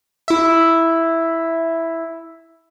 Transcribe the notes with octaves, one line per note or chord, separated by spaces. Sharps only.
E4 E5